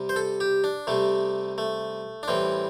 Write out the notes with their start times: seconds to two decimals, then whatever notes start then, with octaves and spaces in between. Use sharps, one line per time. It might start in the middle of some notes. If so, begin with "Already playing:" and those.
Already playing: C3 G3
0.09 C5
0.16 A4
0.40 G4
0.64 D4
0.87 C3 G3 A3
1.58 A3
2.23 D4
2.28 A2 E3 G3 C4